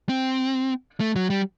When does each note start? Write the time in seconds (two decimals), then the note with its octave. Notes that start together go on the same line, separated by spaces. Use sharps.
0.09 C4
1.00 A3
1.16 F#3
1.30 G3